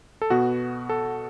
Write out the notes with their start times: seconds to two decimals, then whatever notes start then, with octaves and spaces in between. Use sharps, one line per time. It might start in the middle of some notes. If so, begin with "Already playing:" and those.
0.22 A4
0.30 B2 B3 F#4
0.89 A4